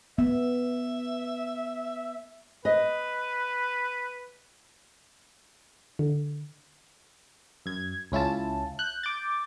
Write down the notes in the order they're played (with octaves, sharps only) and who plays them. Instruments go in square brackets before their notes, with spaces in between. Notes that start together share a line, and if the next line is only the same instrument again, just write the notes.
[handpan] B3 [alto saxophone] E5
[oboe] B4 [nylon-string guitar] D#5
[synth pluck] D3
[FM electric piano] F#2 G#6
C#2 C#4 E4 F4 A5
F#6 G6
D6 G6 A6